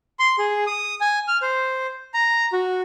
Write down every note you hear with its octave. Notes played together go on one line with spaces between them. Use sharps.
C6
G#4
D#6
G#5
F6
C5
A#5
F#4